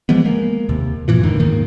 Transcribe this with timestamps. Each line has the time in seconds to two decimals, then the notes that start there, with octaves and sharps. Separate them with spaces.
0.09 E3 F3 G#3 B3
0.25 G#3 A#3
0.69 D#2 C3
1.08 F#2 A#2 E3 F3
1.23 E1 A2 D3 D#3
1.40 D#2 G#2 D#3 A#3